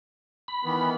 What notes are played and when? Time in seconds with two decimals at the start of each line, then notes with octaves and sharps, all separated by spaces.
0.48 B5
0.63 D#3 E3 B3